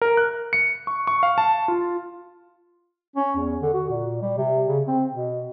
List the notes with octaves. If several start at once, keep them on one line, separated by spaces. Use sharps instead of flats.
A#4
F#6
C#7
C#6
C#6
F5
A5
F4
C#4
E2
D3
F#4
A#2
G3
C3
C#3
C4
B2